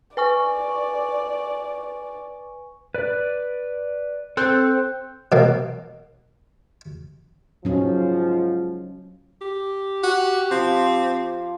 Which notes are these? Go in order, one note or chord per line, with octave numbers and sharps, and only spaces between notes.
B4 D5 G#5 C#6
B4 D5
C4 A4 F#6 G6
B2 A#3
G#2 F3 F#3 C#4
G4
F#4
F3 C4